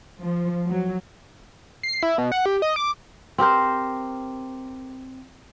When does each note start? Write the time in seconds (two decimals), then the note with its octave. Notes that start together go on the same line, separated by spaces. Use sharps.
0.22 F3
0.68 F#3
1.83 C7
2.03 E4
2.18 B2
2.32 F#5
2.46 G4
2.62 D#5
2.76 D6
3.38 C4 G4 A#4 C5